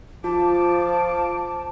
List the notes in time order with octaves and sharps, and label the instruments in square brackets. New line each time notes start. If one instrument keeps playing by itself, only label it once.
[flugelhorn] F3 [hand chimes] F4 [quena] A5 [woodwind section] D6